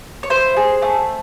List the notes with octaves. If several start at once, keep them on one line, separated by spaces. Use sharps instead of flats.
C#5
E4 C5
G#4
A3